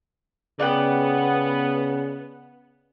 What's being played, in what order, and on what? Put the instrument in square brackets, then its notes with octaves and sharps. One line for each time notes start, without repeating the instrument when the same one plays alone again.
[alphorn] C#3 [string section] B3 [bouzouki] D5 F#5 G5